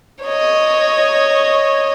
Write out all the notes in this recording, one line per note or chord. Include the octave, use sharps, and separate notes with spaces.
C#5 D#5